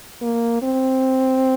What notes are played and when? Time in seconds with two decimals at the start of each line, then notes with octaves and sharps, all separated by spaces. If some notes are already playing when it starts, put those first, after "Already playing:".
0.22 A#3
0.63 C4